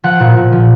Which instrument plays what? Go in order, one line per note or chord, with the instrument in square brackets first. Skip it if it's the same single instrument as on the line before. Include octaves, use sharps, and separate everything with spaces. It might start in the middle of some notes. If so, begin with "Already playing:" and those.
[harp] F3 F#5
A#2
A#2
F3